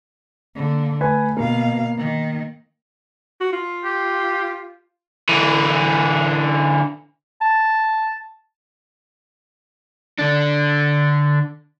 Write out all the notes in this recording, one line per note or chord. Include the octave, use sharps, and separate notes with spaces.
D3 A#3
A3 B4 G#5
B2 A#3 F5
D#3
F#4
F4
G4
D3 E3
A5
D3 D4